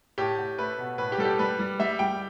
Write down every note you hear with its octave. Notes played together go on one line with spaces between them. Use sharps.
A2 G4
A2
A3 B4
B2
A2 B4
G4
G3 A4
G4
G3 B4
G3
G3 E5
G3 G5